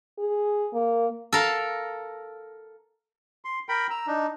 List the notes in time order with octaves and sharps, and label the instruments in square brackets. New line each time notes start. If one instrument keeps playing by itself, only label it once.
[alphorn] G#4
A#3
[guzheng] A4 A#4 F5
[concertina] C6
A#4 G5 B5
A#5 E6
D4 D#4